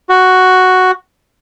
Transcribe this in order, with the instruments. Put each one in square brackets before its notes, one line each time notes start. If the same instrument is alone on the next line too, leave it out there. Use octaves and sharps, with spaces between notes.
[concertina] F#4